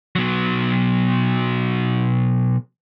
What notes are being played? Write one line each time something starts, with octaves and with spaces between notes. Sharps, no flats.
B2 F#3